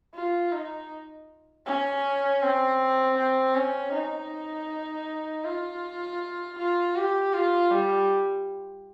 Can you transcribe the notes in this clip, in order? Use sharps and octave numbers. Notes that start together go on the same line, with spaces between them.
F4
D#4
C#4
C4
C4
C#4
D#4
F4
F4
G4
F4
G3